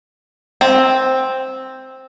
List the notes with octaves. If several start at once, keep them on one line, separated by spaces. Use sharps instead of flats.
C4